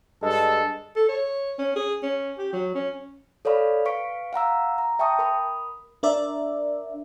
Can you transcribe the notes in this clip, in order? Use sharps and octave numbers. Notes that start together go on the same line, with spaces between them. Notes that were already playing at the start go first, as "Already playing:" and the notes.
G2 G#3 A4
A4
C#5
C#4
G#4
C#4
G4
F#3
C#4
A4 C#5 D5 F5 B5 C#6
B4 F5 C#6 B6 D7
F5 F#5 A#5 E6
A#5
E5 G5 A5 C#6 D#6
A#4 B5 D#6
D4 A#4 D5 E5